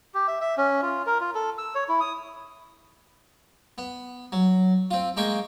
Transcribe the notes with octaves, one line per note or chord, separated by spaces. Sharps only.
G4
E5
E5
C#4
F4
A#4
F4
A4
E6
C#5
E4
D#6
B3
F#3
C4 F4
G#3 A#3 G5 C#6